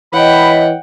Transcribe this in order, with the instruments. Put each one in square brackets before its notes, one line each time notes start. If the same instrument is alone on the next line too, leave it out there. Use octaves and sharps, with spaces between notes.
[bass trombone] E3 [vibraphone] C#5 D#5 [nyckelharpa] F#5 G5 [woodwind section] B5